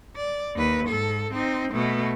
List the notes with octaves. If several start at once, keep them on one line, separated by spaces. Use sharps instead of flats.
D5
D#2 B4
G#2 A4
C4 D#4
B2 A3